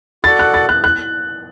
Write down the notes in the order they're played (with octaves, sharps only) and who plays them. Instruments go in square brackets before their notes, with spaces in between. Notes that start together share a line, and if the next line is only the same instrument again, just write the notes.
[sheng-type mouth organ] F#4 A4 D5 F#5 [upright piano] A6
[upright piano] F#6
A6
F#6
F#6